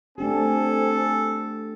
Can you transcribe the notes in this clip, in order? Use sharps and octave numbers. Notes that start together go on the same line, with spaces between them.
A3 C4 D4 G4 A4 G#5